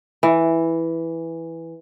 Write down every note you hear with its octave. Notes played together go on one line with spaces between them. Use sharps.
E3